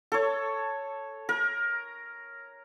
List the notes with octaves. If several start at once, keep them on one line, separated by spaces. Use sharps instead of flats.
A4 C#5
A#4